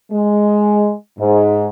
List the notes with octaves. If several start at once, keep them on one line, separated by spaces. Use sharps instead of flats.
G#3
G#2